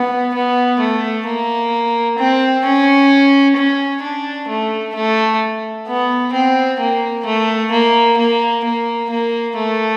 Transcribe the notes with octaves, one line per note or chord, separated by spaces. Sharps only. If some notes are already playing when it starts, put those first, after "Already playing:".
Already playing: B3
B3
A3
A#3
C4
C#4
C#4
D4
A3
A3
B3
C4
A#3
A3
A#3
A#3
A#3
A#3
A3